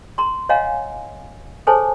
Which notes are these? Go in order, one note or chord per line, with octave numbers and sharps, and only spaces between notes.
A#5 C6
C#5 D#5 F5 F#5 G#5 A#5
G#4 A4 C5 C#5 G#5 A5